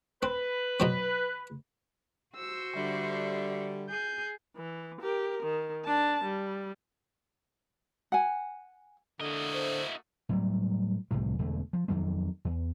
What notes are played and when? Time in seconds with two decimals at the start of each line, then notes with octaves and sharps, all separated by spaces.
0.23 C4 B4
0.80 B2 F#3 C4
2.36 F#4 C5 E6
2.76 D3 G3 E5
3.90 G#4 G6
4.56 E3
5.01 G4 A#4
5.43 D#3
5.85 D4 A5
6.24 G3
8.12 F#5 G#5
9.21 D3 A3 A#3 E4 F#4 D#5
9.53 C5
10.29 A2 F#3 G3
11.11 D1 C2 A2 F3
11.39 E1 E2 D3 A3
11.73 F3
11.88 F2 D#3 F#3 A#3
12.45 E2